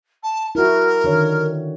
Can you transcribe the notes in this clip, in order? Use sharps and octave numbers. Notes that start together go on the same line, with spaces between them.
A5
E4 F#4 A#4
D3 D#3 C#5